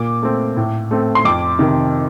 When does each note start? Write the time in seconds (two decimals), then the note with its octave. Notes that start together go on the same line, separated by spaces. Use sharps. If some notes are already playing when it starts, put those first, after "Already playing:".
Already playing: A#2 D6
0.23 A3 C4
0.57 A2
0.91 A3 C4
1.15 C6
1.25 F2 D6
1.59 C3 D#3